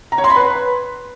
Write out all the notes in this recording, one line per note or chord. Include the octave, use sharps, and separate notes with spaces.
A#5
C#5
C6
B5
B4